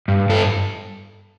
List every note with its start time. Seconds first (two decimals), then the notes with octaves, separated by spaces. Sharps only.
0.08 G2
0.29 G2 A4